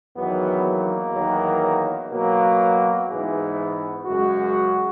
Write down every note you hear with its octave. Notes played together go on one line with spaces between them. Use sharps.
E2 D#3 F#3 B3
A#3
E2 D#3 F#3
B2 F#3 A#3
G#2 E3 G#3 B3
F#2 C#3 G#3 F#4